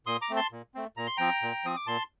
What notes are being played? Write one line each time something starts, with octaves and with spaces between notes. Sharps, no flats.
A#2 C6 D#6
A#5 D6
A3 C4
A5 C6
A#2
A3 C4
A#2 A#5
C6
F3 C4 G5 A#5
A#2
F3 C4 D#6
D6
A#2 A5 C6